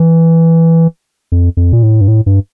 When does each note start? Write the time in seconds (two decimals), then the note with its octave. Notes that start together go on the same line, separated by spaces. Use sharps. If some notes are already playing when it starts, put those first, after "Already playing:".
Already playing: E3
1.32 F2
1.57 F2
1.73 A#2
1.83 A2
2.01 G2
2.08 A2
2.26 G2